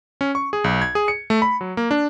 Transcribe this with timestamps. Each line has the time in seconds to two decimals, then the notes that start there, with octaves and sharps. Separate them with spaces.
0.21 C#4
0.35 C#6
0.53 G#4
0.64 B1
0.82 G#6
0.95 G#4
1.08 C#7
1.30 A3
1.42 B5
1.61 F#3
1.77 A#3
1.91 D4